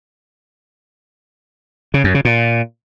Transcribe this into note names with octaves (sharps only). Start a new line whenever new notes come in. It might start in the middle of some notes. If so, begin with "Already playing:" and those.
C#3
F#2
C#3
A#2